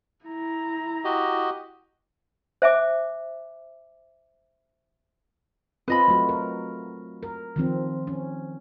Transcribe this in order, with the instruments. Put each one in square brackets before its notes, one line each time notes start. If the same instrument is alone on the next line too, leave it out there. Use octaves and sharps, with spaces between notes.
[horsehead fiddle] E4 A#5
[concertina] F#4 G4 D#5
[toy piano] C5 E5 G#5 D6
[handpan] C4 F4 [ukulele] B4 D#5 B5
[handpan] F#3 A3 F#4
A#4
A#4
D#3 F3 C4
C#4